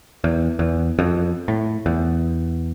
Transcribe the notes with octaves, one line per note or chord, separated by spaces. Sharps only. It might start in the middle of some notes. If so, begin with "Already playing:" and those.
E2
E2
F2
A2
E2